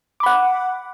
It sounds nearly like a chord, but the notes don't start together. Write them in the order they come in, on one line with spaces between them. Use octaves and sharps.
D6 B5 F#5